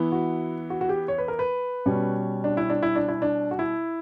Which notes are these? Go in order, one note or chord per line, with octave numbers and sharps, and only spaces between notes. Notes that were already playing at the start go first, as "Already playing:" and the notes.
Already playing: E3 B3 E4
F#4
F#4
F#4
G4
C#5
B4
A#4
B4
B2 G3 C#4
D4
E4
D4
E4
D4
E4
D4
F#4
E4